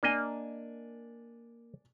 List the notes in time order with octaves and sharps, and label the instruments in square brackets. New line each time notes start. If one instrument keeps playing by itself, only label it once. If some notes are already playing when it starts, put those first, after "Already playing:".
[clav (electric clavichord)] A#3 D#5 [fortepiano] D4 G#5